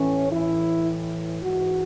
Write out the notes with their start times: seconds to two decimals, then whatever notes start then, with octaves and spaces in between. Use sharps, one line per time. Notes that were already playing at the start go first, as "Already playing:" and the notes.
Already playing: A2 E3 C#4
0.32 A2 E3 E4
1.42 G#2 E3 F#4